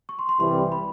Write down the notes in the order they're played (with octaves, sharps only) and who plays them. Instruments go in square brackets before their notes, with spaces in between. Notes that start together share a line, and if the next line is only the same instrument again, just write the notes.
[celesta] C#6
C6
C6
[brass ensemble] C2 C3 E3 G3 [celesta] C6
[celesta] B5